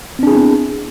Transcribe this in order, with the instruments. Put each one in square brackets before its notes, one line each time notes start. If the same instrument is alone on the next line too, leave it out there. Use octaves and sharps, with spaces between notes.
[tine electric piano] C4
D4
G#4
E4
B3